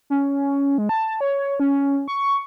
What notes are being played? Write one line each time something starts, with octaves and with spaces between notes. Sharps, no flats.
C#4
G#3
A5
C#5
C#4
C#6